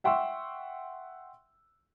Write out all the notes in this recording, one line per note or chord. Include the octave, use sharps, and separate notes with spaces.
E5 F#5 G5 C6 C#6 E6